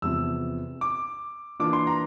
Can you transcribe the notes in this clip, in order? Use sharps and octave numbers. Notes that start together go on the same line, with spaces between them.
E2 C3 F3 E6
D6
E3 A#3 D4 F4 D6
C6
A#5